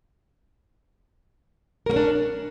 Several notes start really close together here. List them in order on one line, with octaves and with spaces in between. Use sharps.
A#4 A#3 C#4 D4